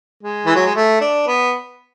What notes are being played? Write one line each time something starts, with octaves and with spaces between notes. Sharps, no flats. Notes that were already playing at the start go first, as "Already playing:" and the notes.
G#3
E3
F#3
G#3
A3
D4
B3